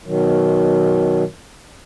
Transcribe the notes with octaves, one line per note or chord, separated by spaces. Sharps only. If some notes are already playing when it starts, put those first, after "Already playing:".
B2 D#3 F#3